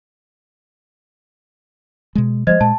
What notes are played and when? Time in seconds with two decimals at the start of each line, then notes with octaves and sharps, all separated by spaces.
2.15 B2 G#3
2.47 F3 G3 G#3 C5 D#5 G#6
2.61 A#2 G#3 A5